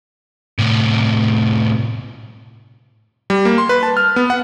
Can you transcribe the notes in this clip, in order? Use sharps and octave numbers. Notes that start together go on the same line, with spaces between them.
A2 C3
G3
A#3
C6
B4
A5
F6
B3
F#5